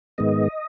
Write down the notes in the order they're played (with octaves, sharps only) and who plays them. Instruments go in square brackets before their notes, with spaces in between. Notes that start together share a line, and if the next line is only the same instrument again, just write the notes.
[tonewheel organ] G#2 D#3 G#3 B3 D#5